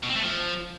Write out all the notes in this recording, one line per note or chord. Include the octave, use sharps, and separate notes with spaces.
B2
C4
A3
F3